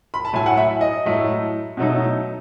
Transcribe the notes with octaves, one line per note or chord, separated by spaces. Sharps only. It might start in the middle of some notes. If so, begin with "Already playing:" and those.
B5
A5
A2 F#3 A3 G#5
F#5
E5
D#5
A2 F#3 A3
B2 F#3 A3 D#4